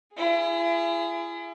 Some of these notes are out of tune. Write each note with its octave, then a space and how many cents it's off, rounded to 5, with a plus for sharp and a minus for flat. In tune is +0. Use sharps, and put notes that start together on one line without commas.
E4 +40 G#4 +0